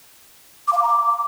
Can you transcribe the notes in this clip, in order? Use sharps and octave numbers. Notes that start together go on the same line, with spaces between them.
D6
F5
D6
A#5
D6